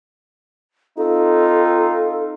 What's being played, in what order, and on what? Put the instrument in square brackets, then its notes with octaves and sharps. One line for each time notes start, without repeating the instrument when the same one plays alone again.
[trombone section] C4 D#4 F4 [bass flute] A4